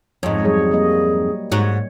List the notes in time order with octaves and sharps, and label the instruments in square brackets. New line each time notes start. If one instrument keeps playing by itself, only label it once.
[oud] F2 G#2 [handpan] C#5 D#5
[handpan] F#3 G3 C#5 [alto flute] G#4
[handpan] G3 A#3 D#5
[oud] G#2 F#4 [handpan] C#5